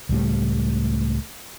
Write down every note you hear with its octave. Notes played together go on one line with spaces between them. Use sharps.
C#2 A2 G3 A3